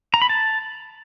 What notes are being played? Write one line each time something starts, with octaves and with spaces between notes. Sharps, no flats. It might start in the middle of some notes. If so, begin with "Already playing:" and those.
A#5
B5
A5